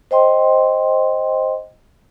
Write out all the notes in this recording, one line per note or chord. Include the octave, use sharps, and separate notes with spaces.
C5 D#5 G5 C6